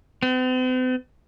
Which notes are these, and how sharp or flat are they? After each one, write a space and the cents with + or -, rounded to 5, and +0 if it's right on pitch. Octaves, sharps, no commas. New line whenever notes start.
C4 -45